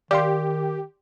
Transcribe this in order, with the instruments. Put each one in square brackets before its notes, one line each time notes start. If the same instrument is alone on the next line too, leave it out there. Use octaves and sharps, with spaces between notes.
[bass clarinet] D#3 [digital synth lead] G4 [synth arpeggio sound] D5 F5 C6